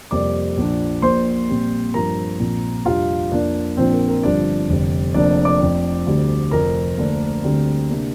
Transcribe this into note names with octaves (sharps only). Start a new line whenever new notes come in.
F2 C3 G3 A#3 D5 D6
A#1 A#2 F3 D4
A#1 A#2 A#3 C5 C6
A#1 A#2 G3 C4
G2 F3 D4 A#4 A#5
A#1 A#2 F3 C4
F2 C3 G3 D4 F4 F5
F2 F3 A#3 D4 D5
A#1 A#2 F3 C4 D4 C5
A#4
A#4
G1 G2 F3 D4 D5
F1 F2 D3 G3 C4
F1 F2 F3 A#3 D4 D5
D5 D6
F2 F3 C4
D2 D3 G3
F1 F2 F3 A#4 A#5
D2 D3 A#3 D4
D2 D3 G3 C4
C3 A#3 D4